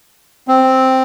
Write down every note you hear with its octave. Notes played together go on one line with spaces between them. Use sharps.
C4